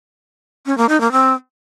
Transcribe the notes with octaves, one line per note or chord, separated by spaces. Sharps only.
C#4
A#3
D#4
A#3
C4